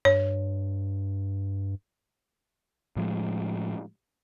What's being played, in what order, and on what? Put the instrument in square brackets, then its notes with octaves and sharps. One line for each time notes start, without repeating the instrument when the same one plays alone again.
[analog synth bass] G2 [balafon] C#5
[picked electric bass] A2 F3 G#3